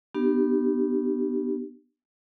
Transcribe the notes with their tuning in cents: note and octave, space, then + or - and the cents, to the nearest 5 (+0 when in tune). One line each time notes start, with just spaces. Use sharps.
B3 +0 D4 +40 G4 -20